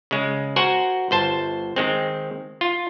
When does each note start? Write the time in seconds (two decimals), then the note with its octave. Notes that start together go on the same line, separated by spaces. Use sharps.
0.11 C#3 G#3
0.56 F#4 A#4 C5 F#5 G#5
1.11 G1 C5 A5
1.76 D#3 G#3 C4
2.61 F4